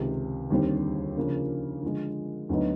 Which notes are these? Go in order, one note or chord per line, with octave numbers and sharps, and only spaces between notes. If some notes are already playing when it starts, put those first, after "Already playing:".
Already playing: C#2 C3 D#3
D#2 D3 G3 C4
C#3 F3 A#3 D4
D3 F3 G#3
D2 D3 F#3 B3 D#4